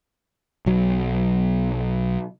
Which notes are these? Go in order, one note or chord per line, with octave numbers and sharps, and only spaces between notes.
B1 F#3